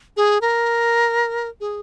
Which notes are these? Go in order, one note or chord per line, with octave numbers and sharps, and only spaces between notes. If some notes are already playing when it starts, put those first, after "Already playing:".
G#4
A#4
G#4